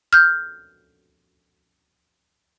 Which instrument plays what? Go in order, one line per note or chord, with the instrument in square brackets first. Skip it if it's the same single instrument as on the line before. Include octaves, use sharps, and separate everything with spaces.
[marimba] F6 G6